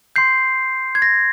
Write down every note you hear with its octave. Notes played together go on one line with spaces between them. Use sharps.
C6 G6 C7
G#6
A#6